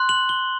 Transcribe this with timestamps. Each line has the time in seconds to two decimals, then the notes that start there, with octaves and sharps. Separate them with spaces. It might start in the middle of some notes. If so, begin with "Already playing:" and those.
Already playing: C6 F#6
0.09 F#7
0.29 G7